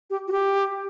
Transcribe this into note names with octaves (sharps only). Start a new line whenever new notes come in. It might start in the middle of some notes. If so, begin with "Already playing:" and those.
G4
F#4
G4